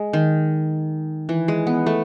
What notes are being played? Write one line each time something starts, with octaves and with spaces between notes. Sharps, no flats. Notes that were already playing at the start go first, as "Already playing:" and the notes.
Already playing: G#3
D#3
E3
G#3
B3
A3